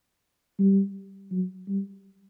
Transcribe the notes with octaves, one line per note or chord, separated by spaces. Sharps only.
G3
F#3
G3